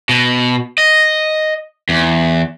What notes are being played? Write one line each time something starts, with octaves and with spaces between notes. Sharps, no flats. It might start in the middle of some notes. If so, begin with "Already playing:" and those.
B2
D#5
E2